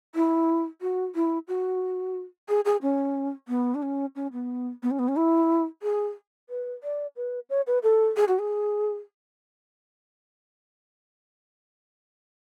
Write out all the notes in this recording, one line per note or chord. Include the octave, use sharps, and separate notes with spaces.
E4
F#4
E4
F#4
G#4
G#4
C#4
B3
D4
C#4
C#4
B3
B3
C#4
B3
C#4
E4
G#4
B4
D5
B4
C#5
B4
A4
G#4
F#4
G#4